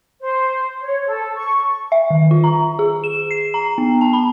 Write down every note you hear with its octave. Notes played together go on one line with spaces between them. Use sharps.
C5
C#5
A4
C#6
E5
D#3
F4
A#5
G#4
E7
C7
A#5
B3
A5
B5